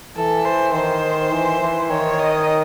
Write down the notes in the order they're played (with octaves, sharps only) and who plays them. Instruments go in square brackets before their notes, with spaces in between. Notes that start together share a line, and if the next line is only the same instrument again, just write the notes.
[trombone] E3 [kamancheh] A4
[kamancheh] C5
[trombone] D#3 [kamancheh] C5
[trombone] E3
E3
[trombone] D#3 [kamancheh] C#5
[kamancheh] D#5